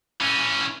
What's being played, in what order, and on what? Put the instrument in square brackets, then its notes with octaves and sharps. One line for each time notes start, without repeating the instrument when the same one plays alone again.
[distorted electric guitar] E3 C#4